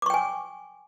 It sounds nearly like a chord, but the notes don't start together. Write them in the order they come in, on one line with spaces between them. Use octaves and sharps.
D6 C#6 G5 G#5